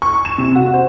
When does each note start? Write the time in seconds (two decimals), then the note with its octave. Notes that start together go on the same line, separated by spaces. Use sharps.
0.02 C#6
0.25 E7
0.38 C3
0.55 F#4
0.74 C5